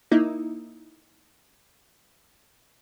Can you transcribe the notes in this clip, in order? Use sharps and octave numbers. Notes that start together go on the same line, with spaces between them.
A#3 D#4 E4